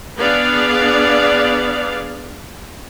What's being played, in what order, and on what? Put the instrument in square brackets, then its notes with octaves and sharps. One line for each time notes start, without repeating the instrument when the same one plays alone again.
[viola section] B3 D4 G#4 D5 F5